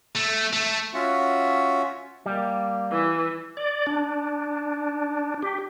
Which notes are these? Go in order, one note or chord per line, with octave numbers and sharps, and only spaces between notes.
A3
A3
C#4 F4 F#4 E5 F#5
G3 A#3
E3
D5
D4
G4